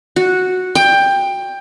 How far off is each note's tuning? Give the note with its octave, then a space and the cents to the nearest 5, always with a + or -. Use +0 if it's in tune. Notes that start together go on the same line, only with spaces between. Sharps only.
F#4 -5
G5 +15